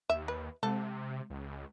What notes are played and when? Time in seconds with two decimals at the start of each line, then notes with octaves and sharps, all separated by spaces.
0.10 D#2 E5
0.28 B4
0.63 C3 G#3 A4
1.30 C#2